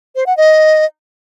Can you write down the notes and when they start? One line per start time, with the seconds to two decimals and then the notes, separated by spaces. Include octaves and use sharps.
0.16 C5
0.26 F#5
0.37 D#5